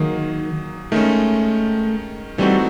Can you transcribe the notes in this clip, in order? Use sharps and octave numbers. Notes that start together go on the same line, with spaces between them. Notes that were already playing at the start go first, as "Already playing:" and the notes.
Already playing: D#3 F#3 A#3 D#4 G#4
D#3 G#3 A3 C#4
E3 G3 A3 C4 D#4 F#4